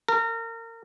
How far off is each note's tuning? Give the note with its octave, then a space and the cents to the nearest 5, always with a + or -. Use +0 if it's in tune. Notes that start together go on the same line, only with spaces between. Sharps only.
A#4 -30